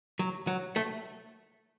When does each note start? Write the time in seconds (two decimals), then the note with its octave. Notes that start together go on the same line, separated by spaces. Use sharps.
0.19 F#3
0.47 F#3
0.76 A3